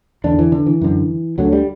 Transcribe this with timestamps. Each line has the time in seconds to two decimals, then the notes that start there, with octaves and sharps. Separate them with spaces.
0.24 E2 D3 D4
0.39 E3
0.52 D3
0.66 E3
0.81 F#2 D3
1.38 D2 D3 F#3
1.53 G3